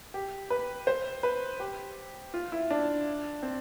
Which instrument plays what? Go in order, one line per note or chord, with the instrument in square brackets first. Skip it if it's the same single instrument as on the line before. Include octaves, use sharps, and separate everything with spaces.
[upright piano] G4
B4
C5
B4
G4
F4
E4
D4
C4